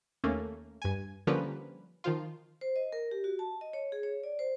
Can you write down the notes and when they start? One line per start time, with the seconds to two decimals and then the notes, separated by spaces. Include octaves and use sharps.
0.24 D#2 A3 A#3 C#4
0.82 G2 G#5
1.27 D3 F3 G3 A#3 C#4 B4
2.04 D#3 F3 F4
2.61 C5
2.76 D#5
2.92 A#4
3.11 G4
3.24 F#4
3.39 A5
3.61 D#5
3.73 C#5
3.92 G#4
4.03 C#5
4.24 D5
4.39 C5